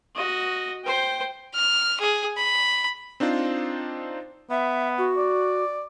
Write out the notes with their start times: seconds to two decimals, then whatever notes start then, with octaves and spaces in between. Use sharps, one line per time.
0.15 F#4 D#5
0.84 C5 G5
1.54 F6
2.00 G#4
2.37 B5
3.20 C4 D4 D#4 F4 C5
4.50 B3 E5
4.98 F#4
5.17 D5